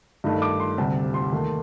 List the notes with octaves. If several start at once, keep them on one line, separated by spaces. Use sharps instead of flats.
G2 D#3 A3 D#4
D6
C6
D2 C3 G3 A5
C6
D#2 D#3 A3